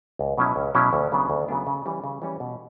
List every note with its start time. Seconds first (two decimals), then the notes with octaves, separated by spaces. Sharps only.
0.19 C#2
0.38 B2 F#3 C#4 E4
0.56 C#2
0.75 B2 F#3 C#4 E4
0.93 D2
1.12 C#3 F#3 B3 D4
1.30 D2
1.48 C#3 F#3 B3 D4
1.67 C#3
1.86 E3 G3 C#4
2.04 C#3
2.22 E3 G3 C#4
2.40 B2